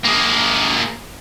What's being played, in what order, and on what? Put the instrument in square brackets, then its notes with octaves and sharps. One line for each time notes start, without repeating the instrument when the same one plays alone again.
[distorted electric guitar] A#3 G#4